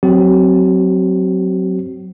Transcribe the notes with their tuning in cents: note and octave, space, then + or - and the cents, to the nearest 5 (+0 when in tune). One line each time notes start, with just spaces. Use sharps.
F#3 +0 C4 +0 F#4 +45